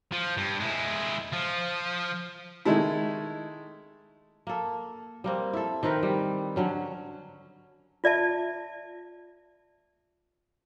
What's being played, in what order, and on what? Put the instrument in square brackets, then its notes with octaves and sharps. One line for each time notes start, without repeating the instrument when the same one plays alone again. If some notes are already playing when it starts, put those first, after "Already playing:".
[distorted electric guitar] F3
G2
G#3 E4
F3
[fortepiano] D#3 G#3 A3 E4
[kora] A#3 A4
G3 A#3 C4
E4 A4
D#3 C4 A#4 B4
G3
D3 F#3 C#4
[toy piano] F4 D5 E5 A5